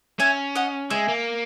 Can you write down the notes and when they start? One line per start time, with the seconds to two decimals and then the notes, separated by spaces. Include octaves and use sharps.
0.20 C#4 E5 G#5
0.56 D#5 F#5
0.90 G#3 E5 G#5
1.08 A#3